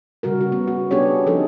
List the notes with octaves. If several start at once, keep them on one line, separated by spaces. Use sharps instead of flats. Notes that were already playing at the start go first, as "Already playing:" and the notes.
C#3 G3 F#4 A#4
F#4
B3
F#4
B3 C#4 D4 G4 G#4 C#5
F3 D#4 G#4 A4